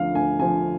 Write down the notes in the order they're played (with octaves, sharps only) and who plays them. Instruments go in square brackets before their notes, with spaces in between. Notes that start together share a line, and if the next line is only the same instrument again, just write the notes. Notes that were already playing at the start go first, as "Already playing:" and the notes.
Already playing: [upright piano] D2 D3 F3 F5
D2 G#5
D3 F3 G#5